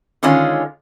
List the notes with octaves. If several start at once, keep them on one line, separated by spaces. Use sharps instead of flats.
D3 D#3 G#3 C#4 F4